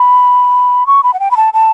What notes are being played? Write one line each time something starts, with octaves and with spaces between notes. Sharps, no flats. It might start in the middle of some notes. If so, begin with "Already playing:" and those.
Already playing: B5
C#6
B5
F#5
G5
B5
A5
A5